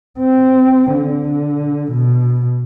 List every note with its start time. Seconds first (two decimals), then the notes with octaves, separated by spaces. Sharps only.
0.19 C4
0.93 D3
1.91 B2